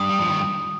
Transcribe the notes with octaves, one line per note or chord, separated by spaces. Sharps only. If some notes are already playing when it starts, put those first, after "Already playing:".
Already playing: G2 D#6
G3
F3
D#3